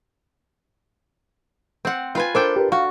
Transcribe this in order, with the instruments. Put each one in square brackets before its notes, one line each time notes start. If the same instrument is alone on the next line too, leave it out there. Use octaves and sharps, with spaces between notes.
[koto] C4 F#5
F4 B4 G#5
[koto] D4 A4 G5 [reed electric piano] A#4 C5 D6
[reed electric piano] G4 A#4 B4
[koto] F#4 [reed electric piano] F5